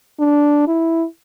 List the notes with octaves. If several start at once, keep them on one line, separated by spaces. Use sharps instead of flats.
D4
E4